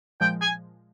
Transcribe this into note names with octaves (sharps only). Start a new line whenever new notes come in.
A#2 F3 G#3 G5
G#5